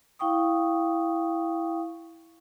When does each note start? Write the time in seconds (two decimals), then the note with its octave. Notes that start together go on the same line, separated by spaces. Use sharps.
0.19 E4 F5 G5 C#6 D#6